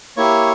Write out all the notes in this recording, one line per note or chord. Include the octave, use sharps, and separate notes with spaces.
A#3 E4 G4 C#5 C#6